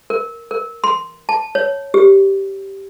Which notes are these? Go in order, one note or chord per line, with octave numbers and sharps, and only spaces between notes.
A#4
A#4
C6
A5
C#5
G4